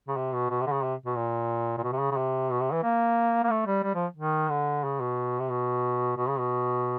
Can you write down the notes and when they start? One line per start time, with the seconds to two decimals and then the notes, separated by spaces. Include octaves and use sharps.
0.08 C#3
0.16 C3
0.34 B2
0.50 B2
0.61 C3
0.67 D3
0.72 C#3
0.83 C3
1.06 B2
1.16 A#2
1.78 A#2
1.83 B2
1.92 C3
2.00 C#3
2.11 C#3
2.17 C3
2.50 B2
2.61 C3
2.72 E3
2.83 A#3
3.44 A#3
3.50 A3
3.67 G3
3.83 G3
3.95 F3
4.16 D#3
4.50 D3
4.84 C#3
5.00 B2
5.39 C3
5.50 B2
6.17 B2
6.28 C#3
6.39 B2